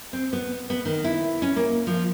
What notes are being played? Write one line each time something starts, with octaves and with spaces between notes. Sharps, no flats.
C4
B3
B3
D#3
E4
C#4
A#3
F3